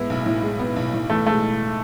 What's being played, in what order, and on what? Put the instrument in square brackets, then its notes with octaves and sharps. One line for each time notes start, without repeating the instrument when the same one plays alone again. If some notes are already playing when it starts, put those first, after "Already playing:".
Already playing: [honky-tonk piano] A2 G#3 B3 [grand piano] E4
[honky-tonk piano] B1
A2
G#3
B3
B1
A2
[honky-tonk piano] E3 [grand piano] A3
[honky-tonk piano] G#3 [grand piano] A3